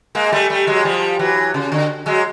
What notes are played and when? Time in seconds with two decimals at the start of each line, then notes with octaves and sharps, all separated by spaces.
0.15 G#3 A#3
0.32 G3 A3
0.50 G3 A3
0.67 F#3 G#3
0.84 F3 G3
1.19 E3 F#3
1.54 C#3
1.72 D3
2.06 F#3 G#3